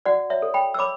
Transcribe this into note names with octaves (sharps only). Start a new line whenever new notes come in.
F#4 D5 F#5
C#5 E5
A4
G5 B5
E6
C#5 B5 D6